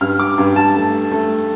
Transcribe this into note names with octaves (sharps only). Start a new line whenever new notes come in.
G2 F6
D6
G2
A5
A3
A3